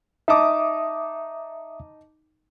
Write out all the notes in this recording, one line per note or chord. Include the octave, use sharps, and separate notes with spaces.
D#4 E5 A5 D6 D#6